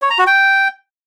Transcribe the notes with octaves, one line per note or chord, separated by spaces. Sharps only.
C#5
A#5
F#4
G5